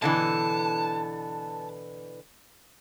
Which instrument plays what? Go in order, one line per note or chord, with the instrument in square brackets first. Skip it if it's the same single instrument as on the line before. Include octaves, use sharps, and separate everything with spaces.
[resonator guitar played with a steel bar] B2 D3 E3 [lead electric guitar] A5